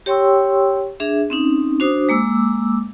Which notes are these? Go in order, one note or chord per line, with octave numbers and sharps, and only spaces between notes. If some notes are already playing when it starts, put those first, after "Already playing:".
G4 C#5 G5 C6 C#6 E6
D4 G#4 E5
C4 C#4 D#4
D4 F#4 C5 D6 D#6
G#3 A#3 D6 E6